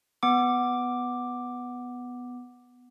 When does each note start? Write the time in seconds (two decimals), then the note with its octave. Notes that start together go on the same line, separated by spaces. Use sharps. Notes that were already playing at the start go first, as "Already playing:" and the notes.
0.23 B3 D6